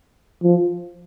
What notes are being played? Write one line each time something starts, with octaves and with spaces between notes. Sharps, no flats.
F3